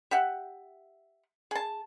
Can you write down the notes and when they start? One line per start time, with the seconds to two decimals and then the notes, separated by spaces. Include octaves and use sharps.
0.11 G4 E5 F#5
1.51 G#4 A5